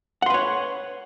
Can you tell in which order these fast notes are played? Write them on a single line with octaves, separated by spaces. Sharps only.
F#5 C6 B4 C#5